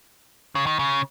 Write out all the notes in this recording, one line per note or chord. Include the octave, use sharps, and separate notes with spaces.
C#3
D#3
C#3